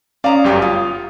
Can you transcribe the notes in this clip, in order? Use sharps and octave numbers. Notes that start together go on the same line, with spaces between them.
C#4 D5 F5 A#5 D#6
G1 F#2 G4
F4 D#6